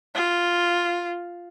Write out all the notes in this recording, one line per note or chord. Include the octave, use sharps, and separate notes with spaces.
F4